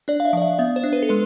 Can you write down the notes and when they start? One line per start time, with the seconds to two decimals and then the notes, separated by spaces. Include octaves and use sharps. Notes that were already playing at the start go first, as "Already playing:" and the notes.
0.08 D4 D5
0.20 F5
0.25 E5
0.33 F3 D5
0.42 E5
0.58 B3 E5
0.76 C5
0.84 D4
0.93 B4
1.02 A4
1.09 G#3 B4